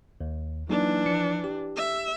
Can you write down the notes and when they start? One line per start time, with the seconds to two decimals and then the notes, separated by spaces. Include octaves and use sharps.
0.21 D#2
0.69 E3 F#3 A#3 D4 D#4
1.06 F3 C#7
1.44 G4
1.77 E5